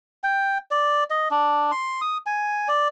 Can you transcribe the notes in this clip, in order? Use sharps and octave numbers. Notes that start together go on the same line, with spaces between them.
G5
D5
D#5
D4
C6
D#6
G#5
D5